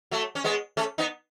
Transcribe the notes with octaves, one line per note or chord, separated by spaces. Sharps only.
F#3 A3
C#4
G#3 B3
A3 C#4
B3 D#4